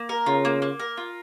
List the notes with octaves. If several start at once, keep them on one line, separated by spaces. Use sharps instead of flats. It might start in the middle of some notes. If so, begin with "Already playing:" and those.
Already playing: A#3
A#4
C#3 F4
A#3
A#3
A#4
F4